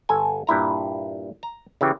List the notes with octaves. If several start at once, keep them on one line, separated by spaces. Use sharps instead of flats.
G1 A4 G#5
G2 A#2 E4 A#5
A#5
C#3 E3 G4